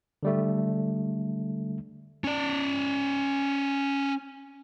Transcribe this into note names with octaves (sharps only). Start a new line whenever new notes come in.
D3 G3 A3
C#4 D5